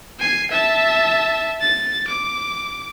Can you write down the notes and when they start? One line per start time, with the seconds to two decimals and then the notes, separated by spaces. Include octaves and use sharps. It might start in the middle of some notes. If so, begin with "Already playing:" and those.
0.20 G#5 C7
0.51 E5 A5
1.60 A6
2.07 D6